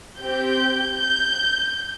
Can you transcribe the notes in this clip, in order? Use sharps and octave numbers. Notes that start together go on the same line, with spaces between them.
C4 G4 G6
G6